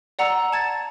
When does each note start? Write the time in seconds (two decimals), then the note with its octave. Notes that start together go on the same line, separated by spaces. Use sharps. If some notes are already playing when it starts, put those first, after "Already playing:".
0.19 D5 F#5 A#5 E6 C#7
0.53 A5 G#6 A6 E7